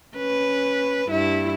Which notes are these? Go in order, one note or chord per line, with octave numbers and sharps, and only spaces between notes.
C#4 B4
G2 E4